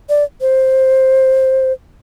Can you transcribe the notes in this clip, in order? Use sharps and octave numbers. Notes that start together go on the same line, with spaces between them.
D5
C5